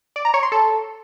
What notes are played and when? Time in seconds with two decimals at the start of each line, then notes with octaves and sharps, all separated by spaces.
0.16 D5
0.25 A#5
0.34 C#5
0.43 C6
0.52 A4